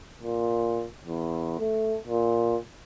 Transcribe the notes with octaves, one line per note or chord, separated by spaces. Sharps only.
A#2
E2
A3
A#2